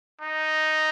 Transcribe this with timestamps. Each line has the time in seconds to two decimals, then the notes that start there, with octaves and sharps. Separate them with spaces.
0.21 D#4